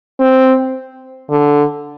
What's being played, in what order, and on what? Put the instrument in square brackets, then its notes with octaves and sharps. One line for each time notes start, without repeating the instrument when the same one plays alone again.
[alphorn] C4
D3